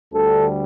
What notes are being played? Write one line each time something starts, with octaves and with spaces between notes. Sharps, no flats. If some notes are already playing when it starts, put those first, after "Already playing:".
D2 D3 G3 A4